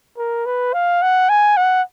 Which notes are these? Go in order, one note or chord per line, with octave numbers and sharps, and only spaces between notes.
A#4
B4
F5
F#5
G#5
F#5